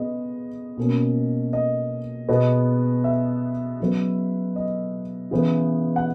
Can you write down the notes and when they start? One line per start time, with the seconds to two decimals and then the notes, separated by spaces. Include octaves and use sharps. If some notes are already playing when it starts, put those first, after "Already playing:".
Already playing: C#3 G#3 B3 D#5
0.77 B2 A#3 C#4
1.53 D#5
2.29 B2 G#3 B3 D#5
3.04 E5
3.80 C#3 F#3 B3
4.56 D#5
5.31 C#3 E3 B3
5.96 F#5